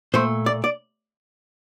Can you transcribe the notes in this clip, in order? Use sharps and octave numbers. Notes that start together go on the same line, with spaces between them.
A#2 A3 C5
D5
D5